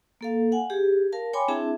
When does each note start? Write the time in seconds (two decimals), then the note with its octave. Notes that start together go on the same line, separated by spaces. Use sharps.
0.21 A#3 A4 F5
0.52 F5 F#5 G#5
0.70 G4 G#4
1.12 A#4 F5 A5
1.33 C#5 G5 G#5 B5 C6 D6
1.48 C4 D4 E4 G#4 E5 A5